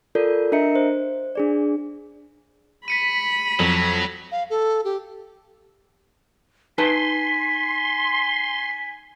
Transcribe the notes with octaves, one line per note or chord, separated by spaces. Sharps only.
F4 A4 A#4 D5 G6
D4 A#4 D#5 E5 A#5 C#7
C5
D4 G#4 D5
B5 B6 C#7 D#7
F2 F#3
F5
A4
G4
D#4 B4 G#5 A5 C6 B6